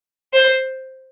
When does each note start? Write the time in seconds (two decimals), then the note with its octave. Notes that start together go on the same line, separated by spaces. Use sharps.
0.33 C5